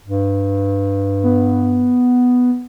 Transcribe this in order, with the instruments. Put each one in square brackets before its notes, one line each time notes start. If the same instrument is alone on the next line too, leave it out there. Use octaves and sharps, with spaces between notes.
[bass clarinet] G2
[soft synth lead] B3